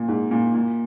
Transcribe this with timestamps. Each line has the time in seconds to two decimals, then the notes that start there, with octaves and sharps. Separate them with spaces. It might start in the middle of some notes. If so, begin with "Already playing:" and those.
Already playing: A#2
0.08 G#2
0.31 A#2
0.54 A#2